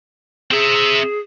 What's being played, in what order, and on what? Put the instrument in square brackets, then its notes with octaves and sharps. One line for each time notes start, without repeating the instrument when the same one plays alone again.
[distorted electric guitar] C4 E5 [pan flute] G#4